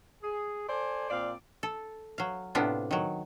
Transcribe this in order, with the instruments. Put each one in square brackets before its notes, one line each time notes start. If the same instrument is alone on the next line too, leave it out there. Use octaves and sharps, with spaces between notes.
[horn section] G#4
A4 C5 D5 G#5
A#2 C4 D5 F5
[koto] A4
F#3 F5
A2 C3 B3 D4 F4
D#3 F#3